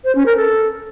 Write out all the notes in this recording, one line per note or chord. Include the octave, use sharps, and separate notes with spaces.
C5
C#4
A#4
A4